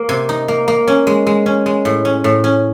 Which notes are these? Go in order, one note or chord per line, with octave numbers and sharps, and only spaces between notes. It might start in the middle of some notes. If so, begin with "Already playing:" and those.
Already playing: A#3
C3
D#4
A#3
A#3
C#4
G#3
G#3
C#4
G#3
A2
C#4
A2
C#4